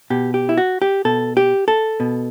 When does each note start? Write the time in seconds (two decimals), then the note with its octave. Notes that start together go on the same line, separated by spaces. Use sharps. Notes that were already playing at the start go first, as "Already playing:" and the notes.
0.10 B2 G4
0.34 G4
0.49 E4
0.58 F#4
0.82 G4
1.05 B2 A4
1.37 G4
1.68 A4
2.00 B2